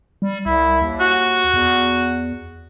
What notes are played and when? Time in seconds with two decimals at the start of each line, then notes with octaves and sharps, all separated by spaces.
0.22 G3
0.46 C2 E4
0.81 D#2
1.00 F#4
1.54 E2